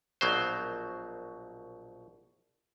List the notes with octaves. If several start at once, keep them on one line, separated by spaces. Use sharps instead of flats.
A#1 B2 F#3 C5